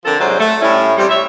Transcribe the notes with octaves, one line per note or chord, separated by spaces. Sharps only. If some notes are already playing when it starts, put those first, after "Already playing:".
D3 F3 C4 A4 A#4
G#2 C3 F#3 G3 C5
A3
A2 G3 C#4 E4
C3 F3 G3
C#5 E5